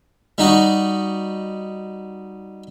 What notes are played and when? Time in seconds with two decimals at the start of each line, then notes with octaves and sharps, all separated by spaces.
0.38 G3 D#4 F#4